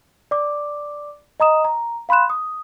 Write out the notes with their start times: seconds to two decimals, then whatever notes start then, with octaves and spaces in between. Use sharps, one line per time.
0.31 D5 D6
1.40 D#5 A#5 D#6 E7
1.65 A#5
2.09 F5 B5 C6 F#6 E7
2.30 D#6